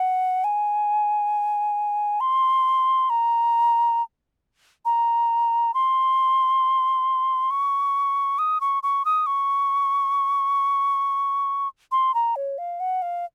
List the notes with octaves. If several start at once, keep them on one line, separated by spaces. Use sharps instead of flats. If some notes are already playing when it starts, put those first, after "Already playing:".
Already playing: F#5
G#5
C6
A#5
A#5
C6
C#6
D#6
C#6
C#6
D#6
C#6
C6
A#5
C#5
F5
F#5
F5